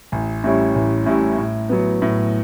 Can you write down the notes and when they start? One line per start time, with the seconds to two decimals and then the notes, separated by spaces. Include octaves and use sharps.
0.12 A1
0.44 A2 G3 C#4 E4
0.75 A1
1.06 A2 G3 C#4 E4
1.38 A2
1.69 F#3 B3
2.02 A2